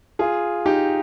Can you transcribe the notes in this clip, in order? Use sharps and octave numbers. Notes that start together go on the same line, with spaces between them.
F4 G#4
D#4 G4